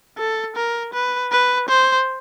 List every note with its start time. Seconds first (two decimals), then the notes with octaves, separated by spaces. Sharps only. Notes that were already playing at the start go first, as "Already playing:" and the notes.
0.18 A4
0.56 A#4
0.93 B4
1.32 B4
1.69 C5